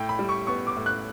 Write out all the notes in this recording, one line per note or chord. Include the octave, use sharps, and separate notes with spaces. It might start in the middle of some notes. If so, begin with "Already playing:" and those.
Already playing: A2 G5
B5
G3
C#6
B3 C#6
D6
A2
F#6